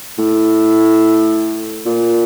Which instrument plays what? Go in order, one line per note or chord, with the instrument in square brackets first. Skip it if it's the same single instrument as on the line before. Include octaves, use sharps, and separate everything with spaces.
[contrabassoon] A2
A#2